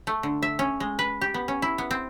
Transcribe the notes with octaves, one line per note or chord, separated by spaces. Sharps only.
A3
D3
E5
C#4
G#3
B4
G4
B3
C#4
E4
B3
C4